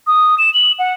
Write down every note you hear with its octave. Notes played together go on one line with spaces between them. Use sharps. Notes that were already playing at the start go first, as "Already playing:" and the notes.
D#6
E7
F#7
F#5